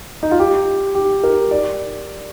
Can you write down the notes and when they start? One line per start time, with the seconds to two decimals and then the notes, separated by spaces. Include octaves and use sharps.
0.23 D#4
0.31 F4
0.40 G4
0.95 G4
1.24 A#4
1.51 D5